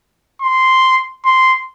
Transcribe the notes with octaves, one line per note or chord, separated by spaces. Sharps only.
C6
C6